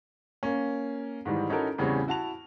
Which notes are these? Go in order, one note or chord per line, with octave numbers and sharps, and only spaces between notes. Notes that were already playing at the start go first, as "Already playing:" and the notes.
A#3 C#4
G#2 D#3 E3 G3
C#4 D#4 E4 F#4 A4 A#4
E2 A2 C#3 G3 C4 C#4
E4 F#4 A5 F7